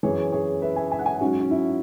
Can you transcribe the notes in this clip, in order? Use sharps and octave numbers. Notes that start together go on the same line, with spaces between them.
F#2 E3 G#4 C#5
G#4 C#5
B4 E5
E5 G#5
E5 G#5
F#5
E5 G#5
G#2 F#3 C#4 F#4
C#4
E4